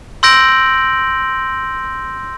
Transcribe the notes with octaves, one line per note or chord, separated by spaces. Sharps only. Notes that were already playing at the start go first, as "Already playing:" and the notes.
C6 E6 G6 A#6 D7 F#7